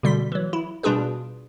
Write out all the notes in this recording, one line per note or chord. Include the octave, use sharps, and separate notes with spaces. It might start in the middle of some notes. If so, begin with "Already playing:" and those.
B2 D3 G3 C6 B6
E3 F#3
E4
B2 G3 D4 F4 G#4 B4